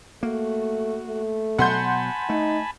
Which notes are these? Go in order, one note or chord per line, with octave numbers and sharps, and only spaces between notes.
A3 A#3 F#4
A3
B2 F#3 F#5 G#5 A5 B5 C6 G6
A3 D#4